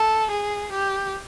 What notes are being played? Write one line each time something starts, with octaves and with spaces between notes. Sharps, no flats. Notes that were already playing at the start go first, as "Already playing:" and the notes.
Already playing: A4
G#4
G4